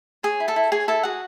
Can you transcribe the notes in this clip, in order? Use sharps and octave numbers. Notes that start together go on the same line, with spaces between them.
G#4 C#5 G#5
E4
A4 A5
E4
G#4 C#5 G#5
E4 A4 A5
F#4 G#4 F#5